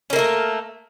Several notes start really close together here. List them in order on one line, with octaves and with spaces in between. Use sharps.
C#4 A#3 A3 A#4